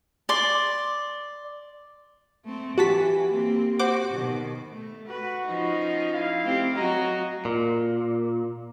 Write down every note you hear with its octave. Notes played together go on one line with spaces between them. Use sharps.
D5 C6
A3 C4
E3 F#4 G4 A5 B6
A#3 C4
F#4 C5 F#5 D6
B2 D#3
A3
F#4 B4
F3 C#4 D#4
E4 F5
A3 C4 G4
F#3 F#4 D#5 A#5
A#2